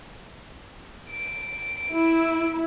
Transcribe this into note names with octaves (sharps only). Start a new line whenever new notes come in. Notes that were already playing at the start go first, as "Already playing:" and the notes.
D7
E4